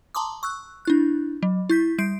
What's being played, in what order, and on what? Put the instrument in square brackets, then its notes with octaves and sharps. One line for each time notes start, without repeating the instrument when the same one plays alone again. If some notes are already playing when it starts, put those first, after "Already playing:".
[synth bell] A5 A#5 C6 D6 D#6
C#6 E6 F#6
D4 E4 F#6
F#3
E4 G6 B6
G3 G6 C7 D7